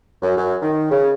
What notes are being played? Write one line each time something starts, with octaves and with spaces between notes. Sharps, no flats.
F#2
F#2
D#3
C#3